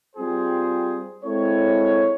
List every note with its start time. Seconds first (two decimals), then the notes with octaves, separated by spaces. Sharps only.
0.15 G3 C4 F4 G#4 C5
1.23 G#3 C4 E4 A4 C#5